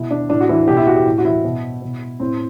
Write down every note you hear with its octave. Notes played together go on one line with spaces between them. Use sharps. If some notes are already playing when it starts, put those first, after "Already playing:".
Already playing: B2 E4
D4
A2 D4
F#4
E3 E4
B2 G4
E4
F#4
G4
A2
F#4
E3 E4
B2
B2
A2 C4